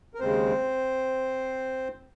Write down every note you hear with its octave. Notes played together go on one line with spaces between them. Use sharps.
A#4
D#2 C#3 G#3 C4 C5